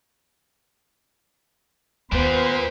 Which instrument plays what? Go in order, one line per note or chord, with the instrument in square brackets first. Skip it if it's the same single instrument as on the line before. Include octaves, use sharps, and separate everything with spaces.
[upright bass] D#2 [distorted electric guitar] A#2 [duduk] B3 [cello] B4 C5